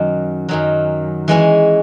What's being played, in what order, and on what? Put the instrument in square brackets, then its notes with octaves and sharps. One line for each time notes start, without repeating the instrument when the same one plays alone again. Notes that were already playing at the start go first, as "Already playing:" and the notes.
Already playing: [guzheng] F#2 D#3 F#3
F#2 D#3 F#3
E3 G#3 C#4 E4